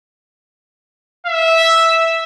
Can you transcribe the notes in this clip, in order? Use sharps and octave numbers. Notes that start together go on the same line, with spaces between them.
E5